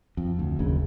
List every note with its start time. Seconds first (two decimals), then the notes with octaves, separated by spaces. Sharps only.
0.17 F2
0.39 D2
0.59 F#1 D#2 C#3